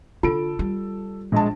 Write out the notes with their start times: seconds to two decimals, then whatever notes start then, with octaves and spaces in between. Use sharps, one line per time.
0.23 D3 F4 A4 D7
0.59 G3
1.32 A#1 G#3 A5